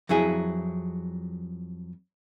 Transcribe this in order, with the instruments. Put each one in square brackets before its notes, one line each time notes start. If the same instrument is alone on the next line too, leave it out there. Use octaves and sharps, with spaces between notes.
[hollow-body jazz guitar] F2 F#3 E4 G#4